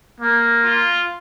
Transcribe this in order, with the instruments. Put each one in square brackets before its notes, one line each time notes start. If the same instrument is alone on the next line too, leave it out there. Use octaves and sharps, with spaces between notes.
[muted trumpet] A#3
[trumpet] F4